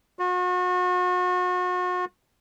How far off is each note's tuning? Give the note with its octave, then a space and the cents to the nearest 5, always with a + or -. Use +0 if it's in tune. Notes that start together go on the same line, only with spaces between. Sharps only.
F#4 -40